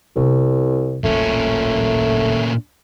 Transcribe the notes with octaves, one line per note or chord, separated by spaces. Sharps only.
C2 C3 B3
D#1 A1 A#2 A3 C#4